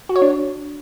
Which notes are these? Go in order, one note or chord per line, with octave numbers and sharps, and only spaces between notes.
F#4
C#5
D4